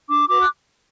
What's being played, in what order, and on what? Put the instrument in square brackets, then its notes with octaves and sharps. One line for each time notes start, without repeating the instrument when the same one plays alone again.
[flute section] D4 D6
F#4 B4 D6
F#6